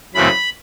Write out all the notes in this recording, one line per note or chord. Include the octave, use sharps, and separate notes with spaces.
F#2 C#3 E3 A3 C4 B5